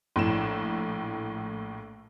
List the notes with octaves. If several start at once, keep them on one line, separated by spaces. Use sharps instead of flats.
A#1 A2 E7